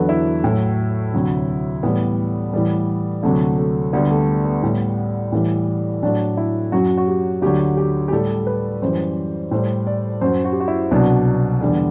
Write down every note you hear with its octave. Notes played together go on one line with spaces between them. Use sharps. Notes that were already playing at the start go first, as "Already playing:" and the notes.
Already playing: E2 D3 F#3 A4 B4
E4
A2 F#3
D2 C3 F#3
A2 E3 G3 B3
A2 E3 G3
D2 C3 F#3 A3
A3
D2 D3 G3 B3
A3
B3
A2 G3
A2 E3 G3
A2 F#3 D4
E4
F#2 F#3 F#4
F#4
G4
D2 D3 F#3 G4
G4
G4
A2 G3 A4
B4
F#2 E3 G3 C5
A2 G3 C5
D5
F#2 F#3 C5
F#4
G4
F#4
E4
C2 B2 F#3 D4
E2 D3 G3